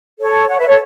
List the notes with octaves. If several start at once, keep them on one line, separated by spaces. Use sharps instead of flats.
A4 C#5
C#5 F#5
B4 E5
A4 C#5